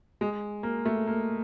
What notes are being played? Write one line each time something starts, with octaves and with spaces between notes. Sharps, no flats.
G#3
A#3
A3
A#3